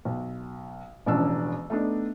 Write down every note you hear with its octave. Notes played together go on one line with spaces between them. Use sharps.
B1
E1 A1 F3 C#4 D4 E6
A3 B3 D4 D#4